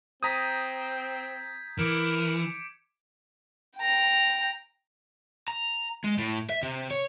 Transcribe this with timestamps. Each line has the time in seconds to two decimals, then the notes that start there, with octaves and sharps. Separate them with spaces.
0.23 C4 A#5 D#6 G6 G#6 B6
1.79 E3 A#4 D6 C#7 D7
3.78 G5 A#5
5.48 A#5
6.04 G#3
6.18 A2
6.49 E5
6.63 C3
6.91 C#5